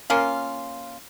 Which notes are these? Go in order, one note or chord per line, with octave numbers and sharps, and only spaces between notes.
A#3 C#4 F4